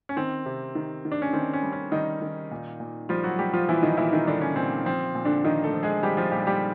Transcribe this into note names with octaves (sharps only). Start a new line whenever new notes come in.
C#4
D#3 C4
C3
D#3
D#3
D4
C#4
D#3 C4
C#4
G3
C#4
D#3 G3 D#4
D#3
A#2
A#2
F3 G3 F4
F#3 F#4
G3 G4
F3 F4
A#2 E3 E4
D#3 D#4
A#2 E3 E4
D#3 D#4
D3 G3 D4
C#4
A#2 C4
F3 C4
A#2
D3 D4
D#3 F3 D#4
A3 A4
F3
G#3 G#4
F3 G3 G4
F3 F4
A#2 G3 G4
G3 G4